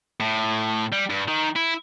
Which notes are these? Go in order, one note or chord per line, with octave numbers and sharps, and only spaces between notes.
A2
G3
G2
D#3
E4